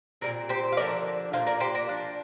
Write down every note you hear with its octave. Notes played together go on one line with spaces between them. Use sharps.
A#2 G3 C4 A#4 D5
G4 C5
F5
D3 F3 D4 A#4 D5
A#2 A#3 D4 C5 F5
A#4 D5
G4 C5
A#4 D5
F3 D4